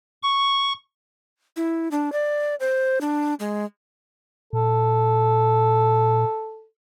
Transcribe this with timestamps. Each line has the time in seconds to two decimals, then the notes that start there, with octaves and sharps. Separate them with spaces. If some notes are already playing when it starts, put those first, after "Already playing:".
0.23 C#6
1.56 E4
1.91 D4
2.12 D5
2.60 C5
3.01 D4
3.40 G#3
4.53 A#2 A4